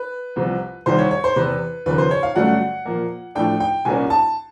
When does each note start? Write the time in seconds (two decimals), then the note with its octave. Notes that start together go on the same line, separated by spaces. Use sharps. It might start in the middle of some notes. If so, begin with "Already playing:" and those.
Already playing: B4
0.36 C2 C3 F3
0.86 C2 C3 D#3 G3 C5
0.98 C#5
1.11 C#5
1.24 C5
1.36 E2 C3 E3 B4
1.86 D#2 C#3 F3 A#3 B4
1.98 C5
2.11 C#5
2.23 F5
2.36 G2 D3 F#3 A3 C#4 F#5
2.86 A#2 F3 A#3
3.35 A2 F3 A3 D4 G5
3.60 G5
3.85 C2 A#2 G3 A#3 C#4 G#5
4.10 A5